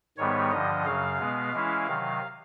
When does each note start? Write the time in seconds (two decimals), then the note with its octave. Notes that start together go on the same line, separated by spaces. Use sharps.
0.18 G#2 D#3 G3 B3 C#5
0.51 G2 D3 F3 D#5
0.85 F#2 C#3 F#3 F5
1.19 B2 G#3 B3
1.53 E3 G#3 C#4 E4
1.87 C3 D#3 F#3